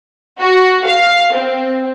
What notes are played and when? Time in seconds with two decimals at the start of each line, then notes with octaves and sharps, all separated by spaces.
0.39 F#4
0.87 F5
1.34 C4